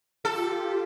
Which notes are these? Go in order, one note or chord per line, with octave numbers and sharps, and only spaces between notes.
F4 G4 A4